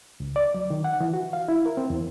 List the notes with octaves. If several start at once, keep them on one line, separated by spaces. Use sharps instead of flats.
C#2
D5
F#3
D#3
F#5
E3
F#4
F5
E4
A#4
C4
E2